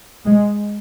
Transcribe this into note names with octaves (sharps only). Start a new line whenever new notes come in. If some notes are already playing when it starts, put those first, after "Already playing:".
G#3